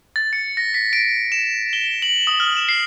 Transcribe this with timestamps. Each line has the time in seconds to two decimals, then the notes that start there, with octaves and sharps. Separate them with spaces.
0.16 A6
0.33 C#7
0.57 A#6
0.74 B6
0.93 D7
1.32 E7
1.73 G7
2.02 F#7
2.27 D#6
2.40 F6
2.57 E7
2.69 C7